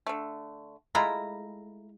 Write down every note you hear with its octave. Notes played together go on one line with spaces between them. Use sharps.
D3 A3
G#3 A3 E4 F4 A#5 B5